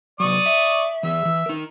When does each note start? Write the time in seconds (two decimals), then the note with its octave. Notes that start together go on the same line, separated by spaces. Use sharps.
0.20 C3 F#3 D5 C#6 D#6
0.46 E5
1.03 E3 G#4 E5
1.25 E3
1.46 D#4 A#4